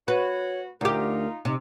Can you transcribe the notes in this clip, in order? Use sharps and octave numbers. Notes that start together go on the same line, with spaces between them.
F#4 B4 C#5
D2 D#4 F4 G4 A#4
C3 D#4